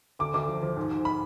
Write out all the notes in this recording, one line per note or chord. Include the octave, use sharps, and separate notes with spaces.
D2 D6
D2 D6
F3
F3
G#2
G#2
B5